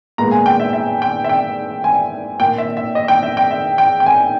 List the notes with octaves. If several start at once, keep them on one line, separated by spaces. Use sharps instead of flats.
A#2 G#3 B3 A#5
G#5
G5
E5
E5
G5
E5
G5
G#5
A#2 A#3 G5
E5
E5
D#5
G5
E5
G5
E5
G5
G5
G#5